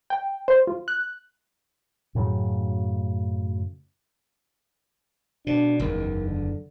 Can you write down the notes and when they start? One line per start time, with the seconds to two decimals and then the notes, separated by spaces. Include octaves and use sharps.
0.10 G5
0.48 C5
0.67 F4
0.88 F#6
2.15 F#2 A2 C#3 F#3
5.47 B2 D4
5.79 F#1 E2 D#3
6.27 D3